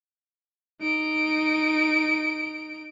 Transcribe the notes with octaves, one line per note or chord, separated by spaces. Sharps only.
D#4 D7